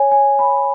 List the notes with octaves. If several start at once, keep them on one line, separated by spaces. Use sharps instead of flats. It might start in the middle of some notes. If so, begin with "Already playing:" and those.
Already playing: C#5 G#5
G#5
B5